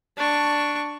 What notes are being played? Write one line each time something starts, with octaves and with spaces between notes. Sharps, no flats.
D4 C#6